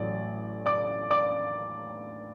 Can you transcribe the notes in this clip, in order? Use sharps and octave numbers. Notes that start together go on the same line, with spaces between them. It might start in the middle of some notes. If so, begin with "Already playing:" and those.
Already playing: A1 A2 F#3 D5
D5 D6
D5 D6